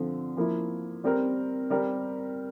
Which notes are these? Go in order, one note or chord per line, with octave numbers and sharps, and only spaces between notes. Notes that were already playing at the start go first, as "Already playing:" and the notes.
Already playing: D3 F3 C4
F3 A#3 E4
G3 C4 G4 A#4
G3 C4 G4 A#4